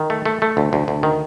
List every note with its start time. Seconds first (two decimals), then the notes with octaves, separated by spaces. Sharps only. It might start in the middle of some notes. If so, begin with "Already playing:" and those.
Already playing: D#3
0.10 A3
0.26 A3
0.42 A3
0.57 D2
0.73 D2
0.88 D2
1.03 D#3